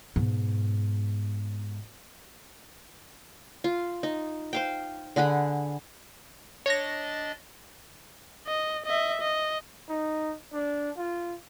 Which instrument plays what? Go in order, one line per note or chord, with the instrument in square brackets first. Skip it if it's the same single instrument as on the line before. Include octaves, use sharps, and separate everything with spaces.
[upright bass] G#2 B2
[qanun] F4
D#4
C5 F5 G5
D3 G#4 F#5 B5
[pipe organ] D4 D#5 A6 [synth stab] C#5 A#6
[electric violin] D#5
D#5 E5
D#5
[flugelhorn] D#4
D4
F4